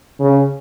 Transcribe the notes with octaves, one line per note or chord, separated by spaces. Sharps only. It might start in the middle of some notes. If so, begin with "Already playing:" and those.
C#3